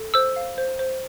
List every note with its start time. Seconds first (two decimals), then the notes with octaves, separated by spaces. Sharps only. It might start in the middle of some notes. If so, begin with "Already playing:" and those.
Already playing: A4
0.14 C5 E6
0.36 F5
0.58 C5
0.79 C5